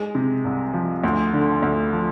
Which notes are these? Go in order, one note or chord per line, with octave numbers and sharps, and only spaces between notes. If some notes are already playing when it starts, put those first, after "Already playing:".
Already playing: G#3
C3
C2
F3
D2
D3
D2
F3